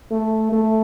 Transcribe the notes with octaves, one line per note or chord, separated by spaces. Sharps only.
A3
A3